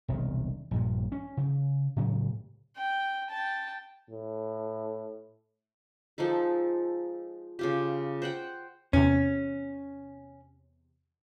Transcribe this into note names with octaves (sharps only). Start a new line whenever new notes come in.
E1 C2 D#3
A#1 G2 A#2
C#4
C#3
A2 C#3 F#3
G5
G5 A5
A2
F3 G#3 D#4 A4
C#3 F4 G4
C5 F#5 G5
E2 C3 C#4